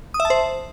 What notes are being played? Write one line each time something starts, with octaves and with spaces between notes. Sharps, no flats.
D#6
E5
A5
C5